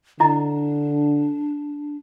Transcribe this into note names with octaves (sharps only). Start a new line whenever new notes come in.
D3 D4 E4 D#5 A#5